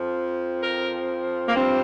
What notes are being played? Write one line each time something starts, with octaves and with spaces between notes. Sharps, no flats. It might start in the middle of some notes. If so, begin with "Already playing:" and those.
Already playing: F2 F3
A#4
A#3
G2 F3 C4